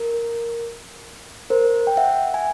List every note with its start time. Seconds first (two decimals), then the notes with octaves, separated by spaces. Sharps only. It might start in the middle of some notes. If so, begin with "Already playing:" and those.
Already playing: A#4
1.50 A#4 C5
1.87 G5
1.97 E5 F#5
2.34 G#5